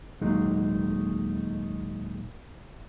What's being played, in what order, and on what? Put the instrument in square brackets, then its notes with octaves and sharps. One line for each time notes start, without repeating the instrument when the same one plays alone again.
[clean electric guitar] D#2 A#2 F#3 G#3 A3 D#4